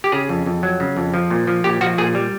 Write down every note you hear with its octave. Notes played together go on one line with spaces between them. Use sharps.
G4
C#3 G#4
F2
F2
F#3
C#3
F2
F3
A#2
F3
A#2 G4
F3 F#4
A#2 G#4
G3